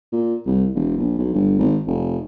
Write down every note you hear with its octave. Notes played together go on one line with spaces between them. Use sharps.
A#2
C2
E1
A#1
B1
G1
G#1
F1